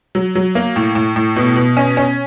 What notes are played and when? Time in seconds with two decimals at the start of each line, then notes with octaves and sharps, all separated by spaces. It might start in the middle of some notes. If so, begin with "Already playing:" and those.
0.15 F#3
0.35 F#3
0.55 A#3
0.76 A2
0.95 A2
1.16 A2
1.36 B2
1.56 B2
1.77 C#4
1.97 C#4